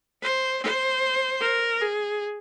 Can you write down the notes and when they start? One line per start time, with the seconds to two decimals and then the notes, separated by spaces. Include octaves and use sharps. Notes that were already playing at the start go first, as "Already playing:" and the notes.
0.22 C5
0.62 C5
1.41 A#4
1.82 G#4